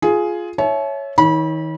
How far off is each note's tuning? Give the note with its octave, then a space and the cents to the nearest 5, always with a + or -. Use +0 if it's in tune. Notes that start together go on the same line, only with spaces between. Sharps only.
F4 +0 G#4 +10
C#5 +0 E5 +0 A5 -45
D#3 +35 C#5 +0 B5 -30